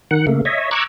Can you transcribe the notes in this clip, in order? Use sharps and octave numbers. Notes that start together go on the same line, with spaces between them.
D#3 F#5
C#3 A3 A#3
C#5 D#5 E5
A#5 C#6 D6 E6 F#6 G#6